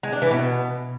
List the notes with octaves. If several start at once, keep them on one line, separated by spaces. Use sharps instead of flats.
G#3
D4
E3
B2